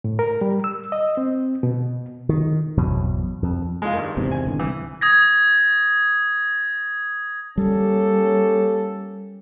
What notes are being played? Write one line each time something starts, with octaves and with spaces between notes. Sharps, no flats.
A2
A#4
G3
E6
D#5
C4
B2
D#3
G#1 E2 B2 F#3
F2
G#3 F4
G2 D#3
E2 G#2 C3
G#5
G#1 D3 E3
C2 E3
D#6 G#6 A#6
G3 A#3 C#4 G4 A4